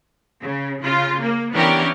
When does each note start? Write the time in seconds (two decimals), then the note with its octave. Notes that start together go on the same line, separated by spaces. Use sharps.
0.41 C#3
0.82 C#3 F4
1.21 A#3
1.52 E3 B3 C#4 D4 G4 A#4